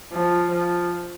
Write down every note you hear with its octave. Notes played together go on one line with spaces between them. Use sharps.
F3
F3